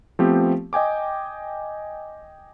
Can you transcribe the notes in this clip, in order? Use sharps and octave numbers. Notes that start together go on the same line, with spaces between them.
F3 A3 B3 C4 G4
D#5 G5 G#5 D6